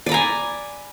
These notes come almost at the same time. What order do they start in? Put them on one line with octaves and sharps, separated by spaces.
D5 B5 A#5 G#5